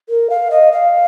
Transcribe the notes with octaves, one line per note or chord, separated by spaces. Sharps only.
A#4
F5
D#5
F5